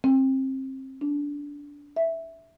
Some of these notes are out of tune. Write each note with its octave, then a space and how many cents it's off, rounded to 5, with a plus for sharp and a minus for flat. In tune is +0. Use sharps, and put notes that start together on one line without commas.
C4 +25
D4 -20
E5 -5